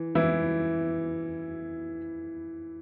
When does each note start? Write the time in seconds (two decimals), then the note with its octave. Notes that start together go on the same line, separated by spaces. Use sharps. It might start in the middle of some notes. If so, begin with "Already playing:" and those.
Already playing: E3
0.15 E3 E4